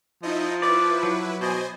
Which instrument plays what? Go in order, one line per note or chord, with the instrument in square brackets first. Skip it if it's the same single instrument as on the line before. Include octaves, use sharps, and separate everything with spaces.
[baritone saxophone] F3 [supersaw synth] D#4 E4 D#5
[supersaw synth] E4 B4 [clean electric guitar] D5
[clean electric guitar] F#3
[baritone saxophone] B2 [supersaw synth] C5 D#5 G#5